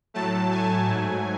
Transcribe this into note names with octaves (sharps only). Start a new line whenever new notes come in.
A2 F#3 A3 A5
G#5
G#2 F#3 A3